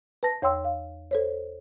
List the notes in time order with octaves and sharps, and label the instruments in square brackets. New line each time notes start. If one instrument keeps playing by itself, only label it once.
[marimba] B4 A5 A#6
E2 C#5 G5 C6 E6
F5
A4 C5 C#5